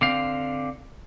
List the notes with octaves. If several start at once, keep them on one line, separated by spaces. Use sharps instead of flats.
D3 C4 F5